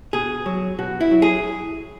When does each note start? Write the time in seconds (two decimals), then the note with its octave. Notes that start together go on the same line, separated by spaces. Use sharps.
0.13 B2 G#4
0.46 F#3
0.79 B2 F#4
1.01 E4
1.11 F#3
1.22 G#4